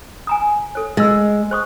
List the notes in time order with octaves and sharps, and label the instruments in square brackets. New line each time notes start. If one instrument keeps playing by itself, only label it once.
[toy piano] G#5 A#5 D#6
A4 C#5
[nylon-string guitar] G#3 [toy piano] D#5 E6
[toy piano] C5 C#6 D#6